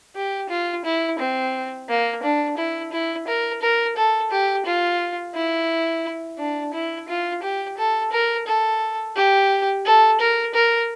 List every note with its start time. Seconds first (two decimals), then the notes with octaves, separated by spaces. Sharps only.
0.16 G4
0.50 F4
0.85 E4
1.19 C4
1.89 A#3
2.23 D4
2.57 E4
2.92 E4
3.28 A#4
3.62 A#4
3.96 A4
4.31 G4
4.65 F4
5.34 E4
6.38 D4
6.74 E4
7.08 F4
7.43 G4
7.78 A4
8.12 A#4
8.47 A4
9.16 G4
9.86 A4
10.20 A#4
10.54 A#4